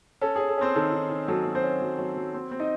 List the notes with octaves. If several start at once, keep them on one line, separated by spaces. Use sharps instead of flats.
C#4 A4
C#4 G#4
A4
C4 C#4 C5
D#3 A4
D#3
D#3
F#3 A4
F#3
C4 C5
C#4
F#3
F#3
F#3
C4
C4
D#4 D#5